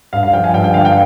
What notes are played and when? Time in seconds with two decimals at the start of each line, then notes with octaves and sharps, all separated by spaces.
0.13 G2 F5
0.23 F5
0.33 F3 G5
0.44 F5 G#5
0.54 G2 G5
0.64 G5
0.74 D3 F5
0.85 G5